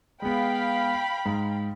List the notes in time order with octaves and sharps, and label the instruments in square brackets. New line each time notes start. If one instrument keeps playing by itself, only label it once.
[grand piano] G#3 B3 [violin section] F5 G5 B5
[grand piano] G#2